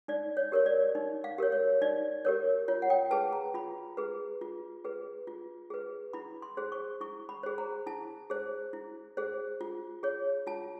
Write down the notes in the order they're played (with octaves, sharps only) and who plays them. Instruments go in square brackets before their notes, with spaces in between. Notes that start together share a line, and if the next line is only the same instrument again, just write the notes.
[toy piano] D#4 D5
C#5
G4 A#4 C#5
D5
D#4
F5
G4 A#4 C#5
C#5
D#4 D5
G4 A#4 C#5
F4 C#5
F#5
G5
G#4 B4 A5
A#5
F4 B5
G#4 B4
F4
G#4 B4
F4
G#4 B4
E4 B5
C6
G#4 C5
C#6
E4 C#6
B5
G#4 C5
A#5
E4 A5
G#4 C5
E4
G#4 C5
F4
G#4 C#5
F4 A5